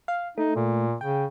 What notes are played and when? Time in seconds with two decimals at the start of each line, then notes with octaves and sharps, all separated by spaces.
0.08 F5
0.38 A3 D#4
0.56 A#2
1.01 C#3 G5